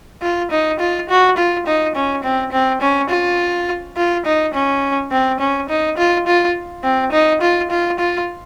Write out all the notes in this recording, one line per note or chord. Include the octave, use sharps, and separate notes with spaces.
F4
D#4
F4
F#4
F4
D#4
C#4
C4
C4
C#4
F4
F4
D#4
C#4
C4
C#4
D#4
F4
F4
C4
D#4
F4
F4
F4